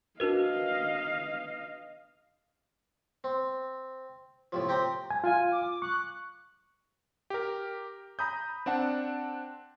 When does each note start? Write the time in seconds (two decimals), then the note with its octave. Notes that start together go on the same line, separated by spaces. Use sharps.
0.20 D4 F#4 A#4 B4 D#5 F5
3.24 C4
4.52 A2 C3 F3
4.69 C4 G4 G5 A#5
5.11 G#5
5.24 F4 F5 G#5
5.51 D6
5.82 C#6 F#6
7.30 G4 A#4
8.19 A#5 B5 D#6 G6
8.66 C4 D4 F#5 A5